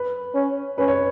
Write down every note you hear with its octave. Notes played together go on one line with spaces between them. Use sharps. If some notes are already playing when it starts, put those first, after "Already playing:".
Already playing: B4
C#4
C#4 B4
C#5